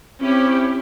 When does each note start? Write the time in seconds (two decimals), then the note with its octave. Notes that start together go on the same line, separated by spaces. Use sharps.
0.21 C4 C#4 E4 G4